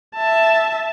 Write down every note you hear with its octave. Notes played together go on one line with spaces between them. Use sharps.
E5 A5